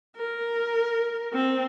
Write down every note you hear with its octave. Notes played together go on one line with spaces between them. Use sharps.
A#4
C4